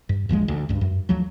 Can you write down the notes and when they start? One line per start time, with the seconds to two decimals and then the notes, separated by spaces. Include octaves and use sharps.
0.09 G2
0.29 D#1 A#1 F3 G#3
0.48 D2
0.69 C#2 G2
0.81 F#2
1.09 D2 F3 F#3